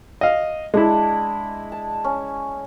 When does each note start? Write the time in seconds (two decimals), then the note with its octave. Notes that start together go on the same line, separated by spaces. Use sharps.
0.21 D#5 F5
0.74 G#3 D4 E4
1.72 A5
2.04 C#4